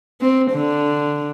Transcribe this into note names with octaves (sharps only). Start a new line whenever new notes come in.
C4
D3